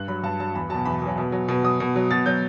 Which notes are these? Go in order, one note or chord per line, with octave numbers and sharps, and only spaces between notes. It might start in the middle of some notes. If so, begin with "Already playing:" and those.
Already playing: G2 F#6
F#3 B5
G2 A5
F#3 A5
E2 B5
B2 F#3 A5
E2 B5
B2 F#3
B2
F#3
B2
F#3 D#6
B2
F#3
B2 A6
F#3 G6